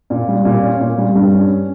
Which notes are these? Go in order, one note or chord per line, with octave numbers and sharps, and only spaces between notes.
A#2
G3
A#2
C#4
A#2
G3
G2
C#4